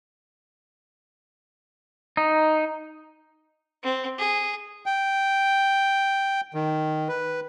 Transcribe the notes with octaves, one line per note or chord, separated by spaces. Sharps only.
D#4
C4
G#4
G5
D#3
B4